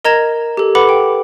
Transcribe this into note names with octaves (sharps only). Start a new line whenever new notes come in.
A#4 D#5 A#5 G#6 A#6 E7
G4 A4
A4 B4 F#5 B5 D6
G5